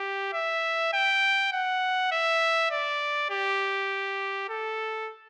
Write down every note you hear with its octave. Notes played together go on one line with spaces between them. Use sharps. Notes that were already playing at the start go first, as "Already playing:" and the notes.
Already playing: G4
E5
G5
F#5
E5
D5
G4
A4